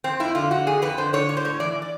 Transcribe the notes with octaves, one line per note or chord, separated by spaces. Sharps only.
F2 C4
F2 E4
D3 F4
D3 F#4
F2 G#4
F2 B4
D3 C5
D3 C#5
A2 C#5
C5
A2 C#5
E3 D5
E3
D5